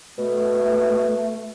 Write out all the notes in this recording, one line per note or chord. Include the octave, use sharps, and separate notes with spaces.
B2 A3